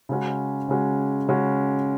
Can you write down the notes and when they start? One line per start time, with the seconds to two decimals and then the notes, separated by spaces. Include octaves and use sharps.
0.09 C#3 G#3 C#4 F#4
0.68 C#3 G#3 C#4 F#4
1.28 C#3 G#3 C#4 F#4